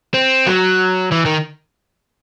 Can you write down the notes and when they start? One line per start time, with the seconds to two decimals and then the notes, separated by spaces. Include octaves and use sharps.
0.14 C4
0.47 F#3
1.12 E3
1.25 D#3